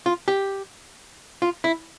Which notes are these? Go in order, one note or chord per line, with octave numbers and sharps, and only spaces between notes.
F4
G4
F4
E4